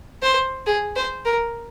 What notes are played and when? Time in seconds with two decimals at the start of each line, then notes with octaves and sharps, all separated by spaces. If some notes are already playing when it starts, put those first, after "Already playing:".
0.22 C5
0.66 G#4
0.96 C5
1.25 A#4